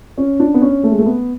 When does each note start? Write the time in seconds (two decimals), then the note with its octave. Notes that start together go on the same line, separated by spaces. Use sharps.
0.18 C#4
0.40 D4
0.54 B3
0.61 C#4
0.83 A3
0.91 G#3
0.99 A3
1.06 B3